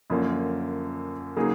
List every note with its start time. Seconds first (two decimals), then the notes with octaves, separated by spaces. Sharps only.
0.10 F#2 D3 F3 A#3 C#4
1.36 C#3 F#3 A#3 D#4 G#4